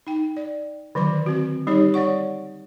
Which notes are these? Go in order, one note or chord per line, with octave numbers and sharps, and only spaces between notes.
D#4 G5
D5
D3 D#3 F#3 B4 C6
C4 F#4
G3 D#4 G4 C#5
C#5 D5 F#5 C#6